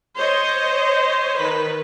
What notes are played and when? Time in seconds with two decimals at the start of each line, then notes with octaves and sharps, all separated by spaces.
0.17 C5 C#5 D#5
1.39 D#3 B4